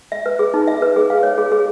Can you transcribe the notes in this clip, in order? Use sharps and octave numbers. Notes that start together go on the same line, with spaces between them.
E5
B4
G#4
D#4
E5
B4
G#4
F5
C#5
G#4
G#4